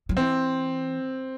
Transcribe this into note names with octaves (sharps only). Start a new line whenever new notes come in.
F#3
E3 C4